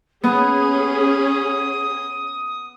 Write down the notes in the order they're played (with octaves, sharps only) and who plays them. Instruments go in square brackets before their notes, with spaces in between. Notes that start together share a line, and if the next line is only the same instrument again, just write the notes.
[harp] B3 [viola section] C#4 G#4 [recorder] D#6